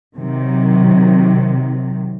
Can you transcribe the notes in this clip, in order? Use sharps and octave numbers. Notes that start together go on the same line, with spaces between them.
C3 D#3 F#3